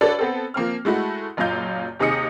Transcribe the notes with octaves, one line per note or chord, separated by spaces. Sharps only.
D4 F#4 A4 B4 C#5 D5
B3 C4 A4
F3 A#3 C4 F6
G#3 A3 E4 F#4
F#1 F#2 A#2 D#5 F5 G6
D#2 C3 D#4 G#4 D#6 C#7